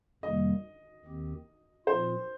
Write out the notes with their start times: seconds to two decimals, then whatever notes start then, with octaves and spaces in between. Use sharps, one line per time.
0.23 F2 C3 D#3 G3 A#3 D#5
1.05 D#2 D#3 C4 G4
1.86 A#2 F3 C4 F4 C5